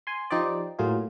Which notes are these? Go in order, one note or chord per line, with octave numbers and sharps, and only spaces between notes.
G#5 C6
F3 D#4 G4 C5 D5
A2 F#3 A#3 F4 G#4